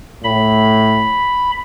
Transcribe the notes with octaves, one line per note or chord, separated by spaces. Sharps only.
A2 B5